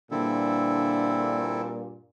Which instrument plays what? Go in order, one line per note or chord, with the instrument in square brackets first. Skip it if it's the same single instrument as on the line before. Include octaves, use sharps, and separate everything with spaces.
[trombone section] G2 A#2 [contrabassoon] D3 [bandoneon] C4 E4 A4